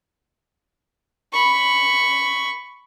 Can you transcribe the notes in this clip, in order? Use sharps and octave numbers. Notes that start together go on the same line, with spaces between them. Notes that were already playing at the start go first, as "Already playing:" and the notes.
B5 C#6